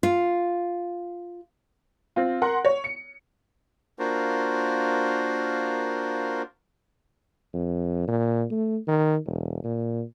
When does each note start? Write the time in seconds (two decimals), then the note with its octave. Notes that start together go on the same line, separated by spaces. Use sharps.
0.03 F4
2.16 C4 F4
2.42 A#4 F#5 C6
2.65 C#5
2.84 C#7
3.99 A#3 D4 F4 F#4 A#4 C5
7.54 F2
8.08 A#2
8.51 A3
8.88 D#3
9.26 E1
9.64 A#2